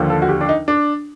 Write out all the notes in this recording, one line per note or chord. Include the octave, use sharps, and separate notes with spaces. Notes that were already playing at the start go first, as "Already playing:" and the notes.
Already playing: D#2 D3 F3
A4
F#4
G4
D4
D#4
D4